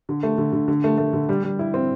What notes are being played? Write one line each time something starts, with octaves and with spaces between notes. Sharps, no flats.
D3
A3
D3
D3
D3
A3
A3
D3
G3
G3
E4
C4